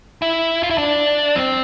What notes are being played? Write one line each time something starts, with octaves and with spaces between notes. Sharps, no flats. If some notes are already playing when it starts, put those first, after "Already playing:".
E4
F4
E4
D4
C4